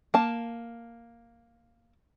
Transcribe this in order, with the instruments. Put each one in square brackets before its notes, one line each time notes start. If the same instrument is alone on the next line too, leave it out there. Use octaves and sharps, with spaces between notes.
[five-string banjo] A#3 A5